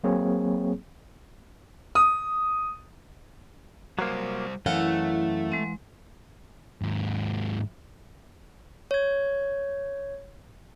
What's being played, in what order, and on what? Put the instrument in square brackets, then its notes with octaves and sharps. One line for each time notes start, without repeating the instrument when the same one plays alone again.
[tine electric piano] F#3 A#3 C4 G#4 C#5
[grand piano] D#6
[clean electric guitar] F#3 A#3 [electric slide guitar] G3 C5
[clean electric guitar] F#2 [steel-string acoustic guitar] E3 F5 F#5 [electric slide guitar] A3 [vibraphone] E4
[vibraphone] G#3 C4
[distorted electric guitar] D#2 G#2
[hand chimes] C#5 G#6